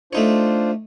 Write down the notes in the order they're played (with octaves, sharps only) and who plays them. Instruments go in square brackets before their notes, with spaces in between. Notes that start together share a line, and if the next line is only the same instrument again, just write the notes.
[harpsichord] A3 D#4 C#5 [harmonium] D4 F4 C5